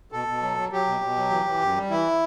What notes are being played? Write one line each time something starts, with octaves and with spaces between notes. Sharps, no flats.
B2 A4
B2
F#3
F#3
F#3 G4
B2
B2
F#3
E3
E3
F#2
G3
E3 E4